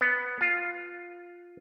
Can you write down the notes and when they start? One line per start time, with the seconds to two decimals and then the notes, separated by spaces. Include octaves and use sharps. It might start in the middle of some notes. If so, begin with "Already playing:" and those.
0.01 B3
0.41 F4